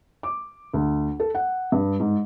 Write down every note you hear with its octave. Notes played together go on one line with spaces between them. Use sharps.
D6
D2
A4
F#5
G2
G#2